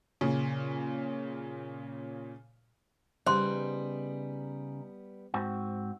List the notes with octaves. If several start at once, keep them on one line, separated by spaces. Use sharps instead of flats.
A#2 C#3
C#3 G3 B3 D#4 C5 C6
G#2 C4 F#4